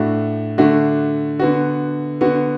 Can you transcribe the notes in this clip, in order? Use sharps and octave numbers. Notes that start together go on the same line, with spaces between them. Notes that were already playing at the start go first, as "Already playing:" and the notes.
Already playing: A2 A3 D4 F#4
D3 A3 D4 F#4
D3 B3 F#4
D3 B3 F#4